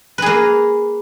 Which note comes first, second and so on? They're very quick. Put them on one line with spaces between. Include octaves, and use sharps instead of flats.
B4 G#4 A#3